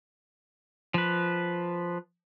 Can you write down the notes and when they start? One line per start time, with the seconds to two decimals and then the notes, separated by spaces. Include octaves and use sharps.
0.94 F3 B4